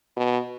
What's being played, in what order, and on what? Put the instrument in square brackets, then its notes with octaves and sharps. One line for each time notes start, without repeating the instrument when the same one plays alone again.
[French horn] B2